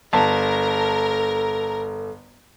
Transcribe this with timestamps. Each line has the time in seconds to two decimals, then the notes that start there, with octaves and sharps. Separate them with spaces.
0.13 G1 A4 A#4 A5